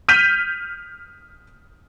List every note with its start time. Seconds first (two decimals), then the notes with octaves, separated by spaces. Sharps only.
0.09 F6 G6 B6 D#7